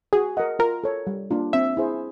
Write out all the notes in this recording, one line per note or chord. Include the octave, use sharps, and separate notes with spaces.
F#4 G#4
A#4 D#5 F#5
F4 A#4
A4 C#5
G3
A#3 D4 F4
C4 E5
E4 G#4 C5